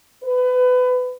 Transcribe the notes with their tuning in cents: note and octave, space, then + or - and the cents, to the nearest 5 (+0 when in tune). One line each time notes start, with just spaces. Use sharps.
B4 +25